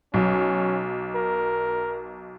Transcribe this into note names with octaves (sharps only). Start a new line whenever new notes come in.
B1 C#4
A#4